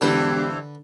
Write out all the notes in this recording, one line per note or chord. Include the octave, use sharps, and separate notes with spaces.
E1 G2 D3 E3 G4 B4 C5